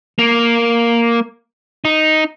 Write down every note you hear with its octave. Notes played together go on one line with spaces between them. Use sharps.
A#3
D#4